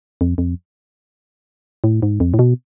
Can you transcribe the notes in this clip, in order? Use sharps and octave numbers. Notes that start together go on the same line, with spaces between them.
F2
F2
A2
G#2
F2
A2
B2